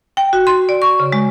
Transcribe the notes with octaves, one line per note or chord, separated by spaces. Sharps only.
G5
F#4
C6
D5
C#6
C#3
G#3